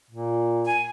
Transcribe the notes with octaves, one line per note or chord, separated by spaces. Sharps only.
A#2
G#5